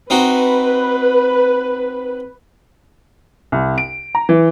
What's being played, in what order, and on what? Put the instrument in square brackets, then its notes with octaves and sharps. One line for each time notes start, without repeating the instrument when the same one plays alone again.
[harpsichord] C4 D#4 F#4 [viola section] B4
[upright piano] C2
D7
A#5
E3